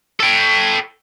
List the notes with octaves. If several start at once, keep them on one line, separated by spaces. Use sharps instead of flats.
A4 G5